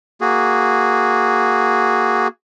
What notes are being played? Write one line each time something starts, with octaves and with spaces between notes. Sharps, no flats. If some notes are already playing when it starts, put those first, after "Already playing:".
A#3 F#4 G#4